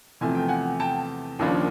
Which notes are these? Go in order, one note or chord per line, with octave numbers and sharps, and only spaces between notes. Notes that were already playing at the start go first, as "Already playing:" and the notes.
E2 C3 F3 A3 G#5
G5
F#5 G#5
G5 A5
D#2 C#3 F3 A#3 D4